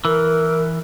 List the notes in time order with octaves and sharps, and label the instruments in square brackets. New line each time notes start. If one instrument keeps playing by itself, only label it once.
[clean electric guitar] E3 [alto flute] A#4